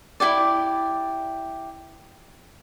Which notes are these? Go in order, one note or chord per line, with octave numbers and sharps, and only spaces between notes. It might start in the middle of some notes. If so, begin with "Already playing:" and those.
E4 F4 G4 D5